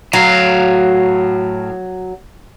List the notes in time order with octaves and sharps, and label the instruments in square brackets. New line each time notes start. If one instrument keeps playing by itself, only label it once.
[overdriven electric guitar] A2 F5 [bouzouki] F#3